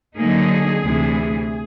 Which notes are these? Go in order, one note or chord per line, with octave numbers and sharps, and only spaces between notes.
D3 F#3 A#3 D#4 G#4
D2 C3 E3